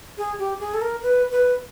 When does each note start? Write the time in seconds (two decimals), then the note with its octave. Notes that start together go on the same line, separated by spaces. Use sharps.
0.18 G#4
0.39 G4
0.60 G#4
0.74 A4
0.81 A#4
1.03 B4
1.31 B4